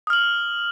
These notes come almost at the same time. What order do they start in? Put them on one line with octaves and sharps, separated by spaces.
D#6 F6 F#7